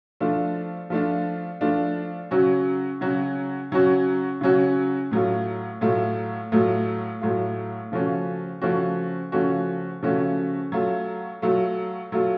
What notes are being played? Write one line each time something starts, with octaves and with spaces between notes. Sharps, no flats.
F3 A3 D4 F4
F3 A3 D4 F4
F3 A3 D4 F4
C#3 F#3 C#4 F#4
C#3 F#3 C#4 F#4
C#3 F#3 C#4 F#4
C#3 F#3 C#4 F#4
A2 F#3 A3 F4
A2 F#3 A3 F4
A2 F#3 A3 F4
A2 F#3 A3 F4
C#3 F3 A3 C#4 F#4
C#3 F3 A3 C#4 F#4
C#3 F3 A3 C#4 F#4
C#3 F3 A3 C#4 F#4
F#3 A3 F4
F#3 A3 F4
F#3 A3 F4